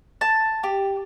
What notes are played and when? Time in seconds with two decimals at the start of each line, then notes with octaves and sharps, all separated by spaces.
0.21 A5
0.63 G4